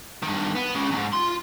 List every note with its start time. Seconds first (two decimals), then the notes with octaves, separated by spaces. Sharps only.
0.23 G2 D#3
0.55 B3
0.75 C#3 G#3
0.91 E2 G#2
1.13 F4 C6